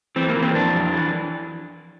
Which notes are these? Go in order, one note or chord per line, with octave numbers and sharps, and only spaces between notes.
E3 C4
A#3
E3
C4
F2 D4
F2
E3